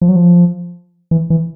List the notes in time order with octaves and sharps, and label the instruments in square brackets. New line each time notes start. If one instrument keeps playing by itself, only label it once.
[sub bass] F3
F#3
F3
E3
E3